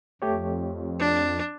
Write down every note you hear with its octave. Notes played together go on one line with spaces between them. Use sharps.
F2 A3 G4 C#5
D4